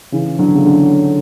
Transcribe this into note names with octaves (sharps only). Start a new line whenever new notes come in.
C#3 E3
D3 F#3
C#3
D3